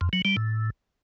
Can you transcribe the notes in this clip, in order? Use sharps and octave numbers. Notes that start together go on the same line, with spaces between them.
F2
F#3
G3
A2